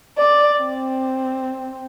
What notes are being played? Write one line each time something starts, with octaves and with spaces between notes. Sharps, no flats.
D5
C4